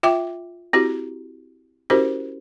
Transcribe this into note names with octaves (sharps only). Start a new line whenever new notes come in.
F4 E5 G5 D6
C4 E4 F#4 G4
C#4 E4 F#4 G4 A#4 C5